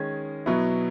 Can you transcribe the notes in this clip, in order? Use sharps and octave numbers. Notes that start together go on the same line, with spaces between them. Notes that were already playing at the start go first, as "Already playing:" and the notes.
Already playing: D#3 G#3 C#4 G#6
B2 F#3 B3 E4